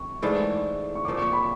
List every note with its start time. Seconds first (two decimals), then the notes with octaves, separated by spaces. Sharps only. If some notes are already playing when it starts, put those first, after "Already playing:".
Already playing: C#6
0.22 G#2 E3 A3 D4
0.95 C#6
1.05 A#2 F3 A#3 C#4 D6
1.18 C#6
1.33 B5